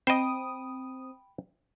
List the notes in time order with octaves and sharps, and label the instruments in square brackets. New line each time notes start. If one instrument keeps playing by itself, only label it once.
[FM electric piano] C4 D#6 [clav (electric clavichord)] C5 D#5 [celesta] G5 B5 D7